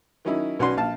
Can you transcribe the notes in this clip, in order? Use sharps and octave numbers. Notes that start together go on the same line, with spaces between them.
D#3 F#3 C#4 D#4 E4
B1 C#4 F#4 B4 D5 C6
A#1 F5 A5